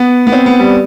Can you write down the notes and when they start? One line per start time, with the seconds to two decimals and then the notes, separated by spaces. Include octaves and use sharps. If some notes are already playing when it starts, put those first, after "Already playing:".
Already playing: B3
0.27 B3
0.32 C4
0.46 B3
0.60 G3